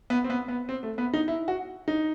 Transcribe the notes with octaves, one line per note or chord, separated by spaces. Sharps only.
B3
C4
B3
B3
C4
A3
B3
D#4
E4
F#4
D#4